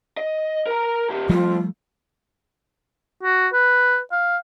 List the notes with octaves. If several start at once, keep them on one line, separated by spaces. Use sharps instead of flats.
D#5
A#4 A#5
A#2 G4
B1 F2 F3 G3 A3 F4
F#4
B4
F5